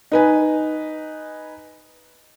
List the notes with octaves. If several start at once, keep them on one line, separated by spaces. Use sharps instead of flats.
D#4 B4 G#5